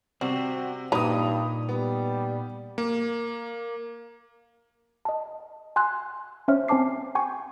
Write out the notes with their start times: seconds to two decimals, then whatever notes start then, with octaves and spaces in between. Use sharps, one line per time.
0.21 C3 G3 C4 F#4
0.92 G2 A#2 A#3 D#4 B4 A#5 B5 D#6
1.69 G3 B3
2.78 A#3
5.05 D#5 A5
5.76 G#5 C6 E6 F#6
6.48 C#4 C5 C#5 E5 F6
6.68 C4 C5 G#5 A5 D6 C7
7.15 G5 G#5 C#6